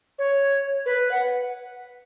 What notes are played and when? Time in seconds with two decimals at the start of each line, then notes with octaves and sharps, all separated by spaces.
0.18 C#5
0.85 B4
1.11 F#5